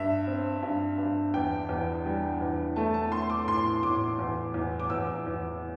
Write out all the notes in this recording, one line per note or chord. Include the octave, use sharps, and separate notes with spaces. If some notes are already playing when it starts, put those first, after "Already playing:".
Already playing: G2 E5
C4
G2
G2
E2 G5
E2
G3
E2
A3 A5
A5
A3 C6
D6
A2 C6
A2 D6
E2
E2
D6
E2 E6
E2